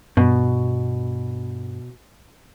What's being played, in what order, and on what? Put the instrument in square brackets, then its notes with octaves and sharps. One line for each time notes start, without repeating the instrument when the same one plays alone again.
[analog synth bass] G2 [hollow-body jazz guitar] B2